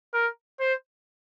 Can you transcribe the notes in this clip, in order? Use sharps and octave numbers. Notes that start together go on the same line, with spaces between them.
A#4
C5